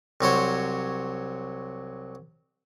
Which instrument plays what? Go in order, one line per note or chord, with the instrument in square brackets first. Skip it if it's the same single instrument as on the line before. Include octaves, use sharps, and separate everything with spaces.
[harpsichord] C2 F#3 C5 C#5